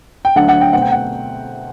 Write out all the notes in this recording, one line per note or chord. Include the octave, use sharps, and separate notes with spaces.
G5
D2 D3 F#3 A3 F#5
F#5
G5
B2 A3 C4 F#5
G5
F#5